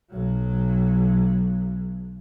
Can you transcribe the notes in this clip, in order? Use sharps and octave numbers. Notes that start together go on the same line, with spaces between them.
B1 F#3